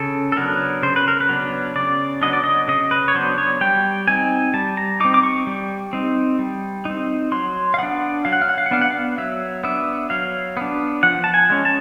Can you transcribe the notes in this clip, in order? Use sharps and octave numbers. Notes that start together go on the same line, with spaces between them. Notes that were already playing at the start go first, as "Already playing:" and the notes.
Already playing: C#3 A4
A4
F#3 B3 D4 A#4
C#3 C5
B4
A#4
B4
F#3 B3 D4
C#3 D5
F#3 B3 D4 D#5
D5
D#5
C#3 D#5
B4
C#5
F#3 B3 D4 C5
C#5
G3 G5
C4 D#4 G#5
G3 A5
A#5
C4 D#4 D6
D6
C#6
G3
C4 D#4
G3
C4 D#4
F#3 C6
F5
B3 D4 F#5
F#3 F5
F#5
F5
F#5
F5
F#5
B3 D4 F5
F#5
F5
F#3 E5
B3 D4 E5
F#3 F5
B3 D4
F3 F#5
A5
G#5
G#3 C#4
A5